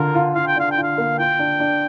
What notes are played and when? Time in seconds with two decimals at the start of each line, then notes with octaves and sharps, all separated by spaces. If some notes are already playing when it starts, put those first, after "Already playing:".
Already playing: D3 F4 A#4
0.15 F4
0.35 F4 F5
0.47 G5
0.56 D4 F5
0.72 G5
0.77 F4
0.83 F5
0.98 A#3
1.19 F4 G5
1.39 D4
1.60 D4